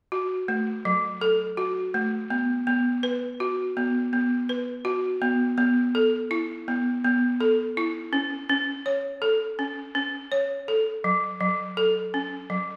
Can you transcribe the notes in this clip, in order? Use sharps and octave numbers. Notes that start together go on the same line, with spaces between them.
F#4
A3
F#3
A4
F#4
A3
B3
B3
B4
F#4
B3
B3
B4
F#4
B3
B3
A4
E4
B3
B3
A4
E4
C#4
C#4
C#5
A4
C#4
C#4
C#5
A4
F#3
F#3
A4
C#4
F#3